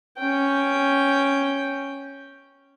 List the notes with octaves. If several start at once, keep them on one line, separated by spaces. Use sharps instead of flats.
C#4 G5